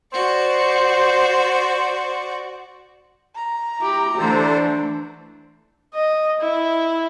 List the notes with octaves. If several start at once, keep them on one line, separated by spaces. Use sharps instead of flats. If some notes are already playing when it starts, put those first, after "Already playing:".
F#4 C5 D5
A#5
E4 G4
D3 E3 A3 D4 A4 C5
D#5
E4